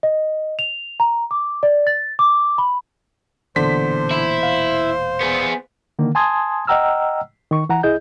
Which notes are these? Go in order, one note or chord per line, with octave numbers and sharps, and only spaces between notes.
D#5
F7
A#5
D6
D5
A6
D6
B5
E1 E2 A#2 D3 C5 B6
E4
F5
B3 G#4
D3 D#3 A#3
G#5 A5 C6 D#6 G#6
D#5 F#5 G5 A#5 E6 F6
D#3 C#6
E3 F#5 A#5
C2 E4 G#4 D#5 G6